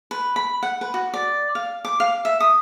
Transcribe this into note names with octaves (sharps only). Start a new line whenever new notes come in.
B4
B5
F#5
B4
F#4
D5
F5
D6
F5
E5
D#6